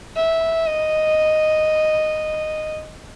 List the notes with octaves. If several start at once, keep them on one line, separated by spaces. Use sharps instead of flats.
E5
D#5